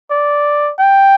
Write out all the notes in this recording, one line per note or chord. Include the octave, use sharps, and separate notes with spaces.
D5
G5